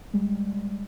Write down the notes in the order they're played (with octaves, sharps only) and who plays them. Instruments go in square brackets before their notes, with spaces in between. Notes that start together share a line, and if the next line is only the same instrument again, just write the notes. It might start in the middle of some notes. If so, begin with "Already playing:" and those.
[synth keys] G3 G#3